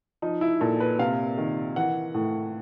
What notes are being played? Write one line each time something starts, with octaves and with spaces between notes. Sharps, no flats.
F3 D#4
E4
A#2 A4
B4
C3 F5
D#3
E3 F#5
A2